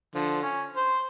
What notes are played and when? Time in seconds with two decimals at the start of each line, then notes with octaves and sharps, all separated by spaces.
0.15 D3 F3
0.43 C#4
0.76 C5